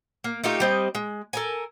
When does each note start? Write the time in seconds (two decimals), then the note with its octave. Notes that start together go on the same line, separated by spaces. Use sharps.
0.24 A#3
0.44 A3 D#4 F4 G4
0.60 G3 C4 D#5
0.95 G#3
1.33 A4 A#4 G#5